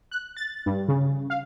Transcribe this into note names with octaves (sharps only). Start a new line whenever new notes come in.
F#6
A6
G2
C#3
F5